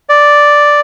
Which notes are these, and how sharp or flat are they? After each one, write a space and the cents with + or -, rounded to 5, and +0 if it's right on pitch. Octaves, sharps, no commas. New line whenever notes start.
D5 +0